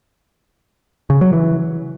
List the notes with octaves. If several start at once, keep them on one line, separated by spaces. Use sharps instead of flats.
C#3
F#3
E3